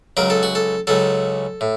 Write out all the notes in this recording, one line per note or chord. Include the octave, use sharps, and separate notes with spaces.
C#2 C#3 F#3 A#4
A4
F#4
A4
C#2 C#3 F#3 A4
A2